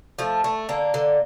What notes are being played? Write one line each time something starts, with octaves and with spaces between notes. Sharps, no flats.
F3 A3
A3
D3 A#3
D3